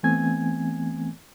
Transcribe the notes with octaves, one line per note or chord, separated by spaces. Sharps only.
E3 A3 B3 C4 G#5 G#6